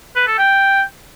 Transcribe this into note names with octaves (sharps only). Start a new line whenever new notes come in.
B4
A4
G5